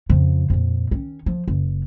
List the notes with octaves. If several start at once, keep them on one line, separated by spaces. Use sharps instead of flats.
F2 C#3
F2 A#2
D#3 C#4
F3
F#1